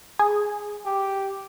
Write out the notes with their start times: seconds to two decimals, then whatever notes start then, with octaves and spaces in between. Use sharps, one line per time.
0.19 G#4
0.86 G4